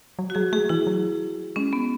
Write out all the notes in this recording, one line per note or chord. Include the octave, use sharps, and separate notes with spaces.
F#3
F#4
F#3 G#4
A3 G#4
E3 E4
F#3
G#3 C#4
B3